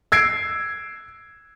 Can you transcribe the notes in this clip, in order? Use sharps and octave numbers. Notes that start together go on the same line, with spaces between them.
E6 G#6 C7 D7